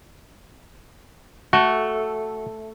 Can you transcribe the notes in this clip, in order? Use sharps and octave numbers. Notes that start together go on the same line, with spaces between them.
A3 F#4